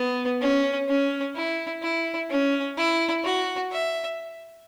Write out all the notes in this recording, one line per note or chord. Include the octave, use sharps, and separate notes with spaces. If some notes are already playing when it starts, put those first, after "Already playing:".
Already playing: B3
C#4
C#4
E4
E4
C#4
E4
F#4
E5